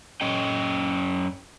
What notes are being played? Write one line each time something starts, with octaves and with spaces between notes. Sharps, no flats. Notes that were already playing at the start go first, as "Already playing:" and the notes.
F#2 C#4 D#5 G5